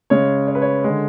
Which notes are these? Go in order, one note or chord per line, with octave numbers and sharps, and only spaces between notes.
C#3 G#3 C#5
C#5
B4
C#5
D3 G#3